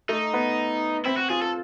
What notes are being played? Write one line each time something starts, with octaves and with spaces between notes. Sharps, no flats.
A3 D#4
B3
C4 E4
F#4
F4 G#4
A4